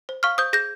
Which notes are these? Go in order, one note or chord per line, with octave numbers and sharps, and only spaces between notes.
C5
F5 C#6 F6
C5 D#6 G6
G#4 G6 A#6